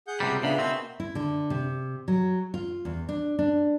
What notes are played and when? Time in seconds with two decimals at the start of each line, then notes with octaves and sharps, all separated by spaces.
0.07 G#4 F#5 G6
0.20 C#2 C3 G3
0.43 A#2 C#3 B3 D4 E5 B5
0.58 B2 A#3 C4 B5 E6
1.00 E4
1.15 D3
1.50 C3
2.08 F#3
2.54 F4
2.85 E2
3.09 D4
3.39 D4